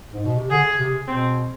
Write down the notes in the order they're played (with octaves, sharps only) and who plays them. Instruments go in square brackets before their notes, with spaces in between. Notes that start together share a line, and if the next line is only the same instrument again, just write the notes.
[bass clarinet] G#2
B2
C3
[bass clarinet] D3 [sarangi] G#4
[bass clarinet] C3
[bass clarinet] B2 [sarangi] C4